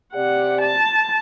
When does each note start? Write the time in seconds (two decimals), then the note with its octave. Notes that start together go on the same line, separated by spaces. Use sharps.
0.15 C3 G4 D5 F#5
0.62 A5